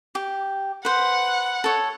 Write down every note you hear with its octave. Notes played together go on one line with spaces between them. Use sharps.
G4
B4 C5 F#5
A4 C#5